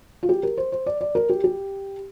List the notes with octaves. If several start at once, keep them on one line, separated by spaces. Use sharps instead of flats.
F4
G4
A#4
C5
C5
D5
D5
A#4
G4
G4